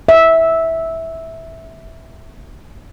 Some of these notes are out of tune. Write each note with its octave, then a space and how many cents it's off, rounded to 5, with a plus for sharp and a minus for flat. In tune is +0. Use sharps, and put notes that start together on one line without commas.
E5 -10